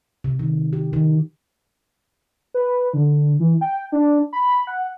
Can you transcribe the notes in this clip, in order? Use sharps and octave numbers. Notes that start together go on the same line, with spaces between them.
C3
D#3
G4
D#3
B4
D3
E3
G5
D4
B5
F#5